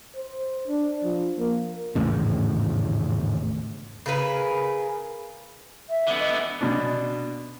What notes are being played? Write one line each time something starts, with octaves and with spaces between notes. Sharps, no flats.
C5
D4
F3
A#3
G#1 E2 A2 C#3
C#3 G#4 A#4 B4
E5
D3 B3
D#5
B2 D4